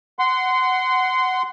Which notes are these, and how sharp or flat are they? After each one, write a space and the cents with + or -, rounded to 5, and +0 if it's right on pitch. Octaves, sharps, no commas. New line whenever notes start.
F#5 +5 C6 -20